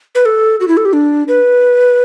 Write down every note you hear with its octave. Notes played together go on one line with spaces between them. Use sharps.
B4
A4
F#4
E4
A4
G4
D4
B4